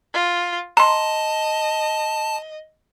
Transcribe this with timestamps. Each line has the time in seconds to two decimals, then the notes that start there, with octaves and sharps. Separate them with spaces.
0.14 F4
0.77 D#5 A5 A#5 C6